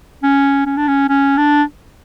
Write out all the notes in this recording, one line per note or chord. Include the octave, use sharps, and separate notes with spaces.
C#4
C#4
D4
C#4
C#4
D4